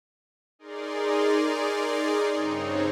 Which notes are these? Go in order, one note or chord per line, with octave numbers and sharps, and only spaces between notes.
D#4 G#4 A#4 D5 C6
G2 C#3 C4 D#4 C#5